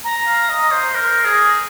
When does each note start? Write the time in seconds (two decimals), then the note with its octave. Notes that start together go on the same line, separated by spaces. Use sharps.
0.04 A#5
0.26 F5
0.49 D#5
0.71 C5
0.95 A#4
1.25 G#4